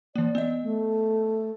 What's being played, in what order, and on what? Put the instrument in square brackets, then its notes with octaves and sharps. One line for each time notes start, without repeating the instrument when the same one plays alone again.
[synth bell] E3 A#3 [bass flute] D5
[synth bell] B3 D#5
[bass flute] A3